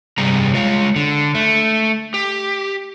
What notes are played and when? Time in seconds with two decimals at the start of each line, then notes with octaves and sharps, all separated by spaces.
0.18 G2 C3 G3 G#4 A#5
0.54 G#3 F4 C#5
0.96 D3
1.35 A3
2.14 G4